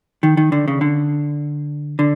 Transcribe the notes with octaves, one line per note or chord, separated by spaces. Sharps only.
D#3
D#3
D3
C#3
D3
D3